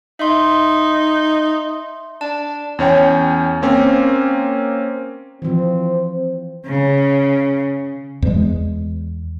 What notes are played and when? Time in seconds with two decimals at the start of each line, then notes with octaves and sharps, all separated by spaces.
0.19 D#4 E5 C6
2.21 D4 A5
2.79 E2 C#4 C#5 G5
3.62 A#3 C4 C#4
5.42 E3 F3 C4
6.67 C#3
8.22 E2 G#3